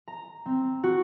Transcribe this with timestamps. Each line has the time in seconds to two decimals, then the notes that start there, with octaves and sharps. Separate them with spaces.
0.08 A#5
0.46 C4
0.83 F#4